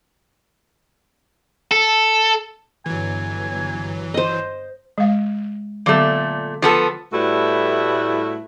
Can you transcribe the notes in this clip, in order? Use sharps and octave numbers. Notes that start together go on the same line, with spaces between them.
A4
G1 E3 F#3 G#5
C5 D#5
G#3 F5
A#2 D3 F#3 A3 B3
F3 B3 A4 D6
A2 G3 A3 E4 F#4 B4